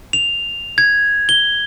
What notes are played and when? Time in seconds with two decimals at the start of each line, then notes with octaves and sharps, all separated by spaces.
0.13 F7
0.78 G#6
1.29 G7